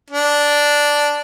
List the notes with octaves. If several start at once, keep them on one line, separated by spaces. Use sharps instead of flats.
D4